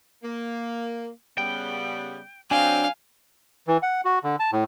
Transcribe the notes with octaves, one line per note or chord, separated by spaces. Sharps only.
A#3
C#3 G3 B3 G5
F#3 C4 D4 F5 G5 G#5
E3
F#5
F#4
D3
A5
A2